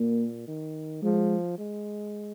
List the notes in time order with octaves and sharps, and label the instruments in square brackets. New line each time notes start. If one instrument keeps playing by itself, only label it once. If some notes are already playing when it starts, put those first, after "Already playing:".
Already playing: [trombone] A#2 [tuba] A#3
[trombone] D#3
[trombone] F3 [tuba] G#3
[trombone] G#3